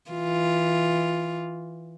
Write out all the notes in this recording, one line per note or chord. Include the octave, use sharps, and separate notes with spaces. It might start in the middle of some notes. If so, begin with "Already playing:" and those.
E3 F4